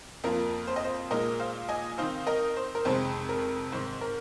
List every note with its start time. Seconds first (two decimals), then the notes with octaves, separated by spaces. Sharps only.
0.24 F2 F3 A#3 F4 A#4
0.67 C5
0.76 D#5
0.84 C5
1.11 A#2 G#3 D#4 A#4 D#5
1.40 C5 F5
1.69 D#5 G#5
1.98 D#3 C4 D#4 C5 F5
2.27 A#4 D#5
2.57 C5
2.75 A#4
2.85 F2 C3 D#3 G#3 C4 C5
3.29 A#4
3.72 G#2 D#3 C4 C5
4.01 A#4